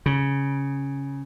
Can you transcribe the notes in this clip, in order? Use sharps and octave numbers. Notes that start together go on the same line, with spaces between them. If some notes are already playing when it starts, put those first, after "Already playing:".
C#3